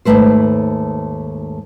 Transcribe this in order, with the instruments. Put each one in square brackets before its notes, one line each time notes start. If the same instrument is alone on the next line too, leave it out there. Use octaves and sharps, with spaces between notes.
[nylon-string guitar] D#2 G#2 C#3 A3 B4 C5